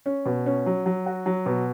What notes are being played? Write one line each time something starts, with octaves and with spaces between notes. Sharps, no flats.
C#4
B2
C#4
F#3
F#3
F#4
F#3
B2